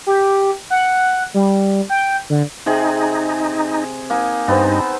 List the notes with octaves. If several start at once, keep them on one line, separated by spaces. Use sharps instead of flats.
G4
F#5
G3
G5
D3
C3 D#4 G#4 D#5
A#3 D#4 G#5
G2 B3 C4 D#4 C5